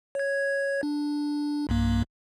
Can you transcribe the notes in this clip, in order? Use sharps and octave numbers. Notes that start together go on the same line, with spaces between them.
C#5 G#6
D4
B1 G2 A#3